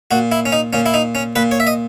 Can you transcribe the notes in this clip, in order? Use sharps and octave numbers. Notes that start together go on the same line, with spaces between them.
A#2 F#4
E4
C#4
D#4
A#2 C#4
E4
D#4
C#4
A#2 B4
C#5
E5
D#5